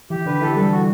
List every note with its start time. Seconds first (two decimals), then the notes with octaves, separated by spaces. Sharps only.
0.10 E3 G4
0.26 D3 B4
0.41 E3 A4
0.56 G3 A4
0.72 F#4